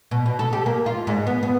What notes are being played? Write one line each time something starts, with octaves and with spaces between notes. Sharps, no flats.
B2
B2
A4
G4
A#3
F4
G#2
B3
B3